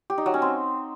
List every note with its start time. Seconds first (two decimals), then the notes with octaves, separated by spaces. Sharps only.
0.10 G4
0.18 D#4
0.26 F#3
0.34 C#4
0.42 C4